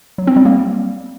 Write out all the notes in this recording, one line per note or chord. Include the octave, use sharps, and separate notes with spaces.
F#3
C4
G3
A#3